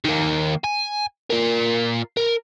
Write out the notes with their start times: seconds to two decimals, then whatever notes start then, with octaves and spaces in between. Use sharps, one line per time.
0.05 D#3 A#3
0.64 G#5
1.30 F4 A#4
2.17 A#4